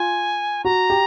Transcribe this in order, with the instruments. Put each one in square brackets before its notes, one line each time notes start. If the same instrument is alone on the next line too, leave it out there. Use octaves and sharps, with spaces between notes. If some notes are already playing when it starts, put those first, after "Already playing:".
Already playing: [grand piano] F4 [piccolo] G#5
[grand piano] F#4 [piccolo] A#5
[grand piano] G4